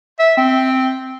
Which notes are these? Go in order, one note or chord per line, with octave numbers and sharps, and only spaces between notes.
E5
C4